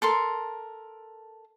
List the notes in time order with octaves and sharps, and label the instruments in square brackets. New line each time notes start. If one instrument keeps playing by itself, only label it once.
[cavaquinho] A4 A#4 C6